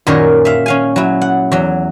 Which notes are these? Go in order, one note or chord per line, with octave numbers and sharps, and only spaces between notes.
F#2 A#2 D#3 G#4 A#4 C#5
E5 F5
C#4 F5 G#5
F#3 E4
F#5
E2 F#3